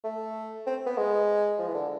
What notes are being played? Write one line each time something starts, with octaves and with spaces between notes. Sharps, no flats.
A3
C4
B3
G#3
F3
E3
D3